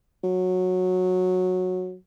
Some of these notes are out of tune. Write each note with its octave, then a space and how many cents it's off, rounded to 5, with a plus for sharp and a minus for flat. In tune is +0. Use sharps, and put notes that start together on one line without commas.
F#3 -15